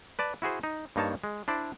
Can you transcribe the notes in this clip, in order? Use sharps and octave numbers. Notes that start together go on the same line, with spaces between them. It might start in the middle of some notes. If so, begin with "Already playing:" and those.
B4 D5 A5
E4 F#4 G#4 C5
D#4
G2 A#3 D#4 C#5 A5
G#3
D4 E4 C5 D5